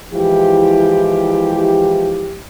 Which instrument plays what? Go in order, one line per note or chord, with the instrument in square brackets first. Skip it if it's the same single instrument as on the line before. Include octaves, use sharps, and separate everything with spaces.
[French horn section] E3 F3 G#3 E4 G4